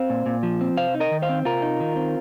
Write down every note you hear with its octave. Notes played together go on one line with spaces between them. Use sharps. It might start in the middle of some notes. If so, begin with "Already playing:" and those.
Already playing: C4 C5 F5
A#2
A#2
F3
C4
C3 C5 F5
D#4
A#4 D#5
D#3
C5 F5
C4
C3 F4 A#4
D#4
D#3
C4